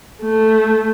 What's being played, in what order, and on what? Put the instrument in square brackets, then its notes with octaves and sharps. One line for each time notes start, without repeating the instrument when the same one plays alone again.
[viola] A3